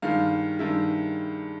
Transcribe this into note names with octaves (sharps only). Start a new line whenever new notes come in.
G2 D#3 G#3 F5
G2 D#3 G#3 E5